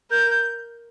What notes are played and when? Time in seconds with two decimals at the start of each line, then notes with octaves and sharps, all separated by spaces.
0.11 A#4 G6
0.30 G6